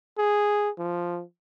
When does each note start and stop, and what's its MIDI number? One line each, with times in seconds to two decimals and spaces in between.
0.18 0.70 68
0.78 1.22 53